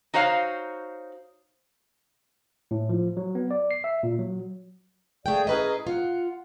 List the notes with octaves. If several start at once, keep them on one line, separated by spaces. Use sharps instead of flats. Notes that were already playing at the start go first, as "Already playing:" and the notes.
D#4 F#4 C5 C#5 F5
A2
F3
F#3
B3
D5
C7
E5
A#2
F#3
A3 G#4 D5 F5 G5
C#4 E4 G#4 B4 D#5 A#5
F4 F#5